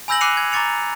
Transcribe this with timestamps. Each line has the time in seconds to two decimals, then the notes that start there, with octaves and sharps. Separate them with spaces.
0.08 G#5 B5 E6 G6 A#6 F#7
0.21 D6 F#6 C7 C#7 D#7 F7
0.37 G#6
0.52 A#5 C#6 D6 A6 C#7 F7